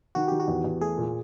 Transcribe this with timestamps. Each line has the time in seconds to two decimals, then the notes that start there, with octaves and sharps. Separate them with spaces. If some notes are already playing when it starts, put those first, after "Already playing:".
0.15 D#3 F#4
0.28 D#3 G4
0.40 F#4
0.48 E2
0.64 E2
0.81 A3 G#4
0.98 A#2